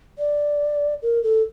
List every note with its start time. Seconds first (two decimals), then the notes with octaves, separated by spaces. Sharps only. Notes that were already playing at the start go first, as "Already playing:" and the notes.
0.18 D5
1.02 A#4
1.23 A4